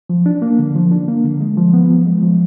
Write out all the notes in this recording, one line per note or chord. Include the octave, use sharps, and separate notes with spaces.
F3
D4
A#3
D3
F3
D4
A#3
D3
G#3
F3
B3
F3
G#3
F3